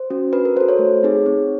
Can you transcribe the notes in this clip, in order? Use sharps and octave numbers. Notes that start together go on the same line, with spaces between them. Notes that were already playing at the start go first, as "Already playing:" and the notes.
Already playing: C5
C#4 F#4
D4 B4
A#4
F#4 A4 C5
C#5
A3
C4 D#4 G#4
C4